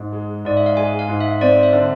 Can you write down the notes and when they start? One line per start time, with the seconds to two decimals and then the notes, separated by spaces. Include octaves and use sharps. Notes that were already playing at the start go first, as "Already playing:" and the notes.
Already playing: G#2
0.12 G#3
0.45 G#2 D5
0.57 E5
0.66 F5
0.77 G#3 G#5
0.99 F5
1.09 G#2
1.20 E5
1.41 C4 D5
1.63 E5
1.73 D3